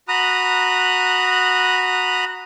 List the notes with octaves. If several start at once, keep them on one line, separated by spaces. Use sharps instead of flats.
F#4 A#5 B5 D#6 F#6